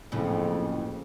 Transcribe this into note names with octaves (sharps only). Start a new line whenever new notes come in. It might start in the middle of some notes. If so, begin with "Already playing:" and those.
F#1 F2 A2 C#3